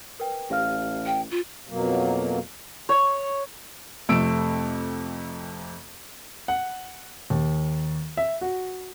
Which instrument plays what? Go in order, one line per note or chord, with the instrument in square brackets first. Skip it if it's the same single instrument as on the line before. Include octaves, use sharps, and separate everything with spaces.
[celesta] A#4 B4 G5
[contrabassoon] A1 [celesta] G4 F5 F6
[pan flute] G5
F4
[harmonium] F2 B2 F#3 A#3
[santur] C#5
[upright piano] F2 C3 A3 E6 D7
[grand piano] F#5
D#2
E5
F#4